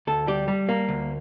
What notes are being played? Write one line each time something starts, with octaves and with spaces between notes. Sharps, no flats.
D2 A4
G3 G4
G3
A#3
D2